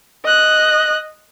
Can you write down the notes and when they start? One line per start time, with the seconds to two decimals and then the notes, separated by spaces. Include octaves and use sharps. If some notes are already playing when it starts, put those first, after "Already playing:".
0.25 D#5 F#6